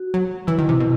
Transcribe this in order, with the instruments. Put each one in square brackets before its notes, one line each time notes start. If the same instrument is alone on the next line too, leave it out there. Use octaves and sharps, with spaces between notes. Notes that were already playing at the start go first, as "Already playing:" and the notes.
Already playing: [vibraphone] F#4
[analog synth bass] F#3
[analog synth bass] E3 [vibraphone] E4
[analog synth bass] D#3
C3
B2